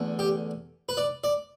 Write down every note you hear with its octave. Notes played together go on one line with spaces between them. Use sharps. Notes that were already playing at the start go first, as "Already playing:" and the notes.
Already playing: E2 D3 A3
G4
B4
D5
D5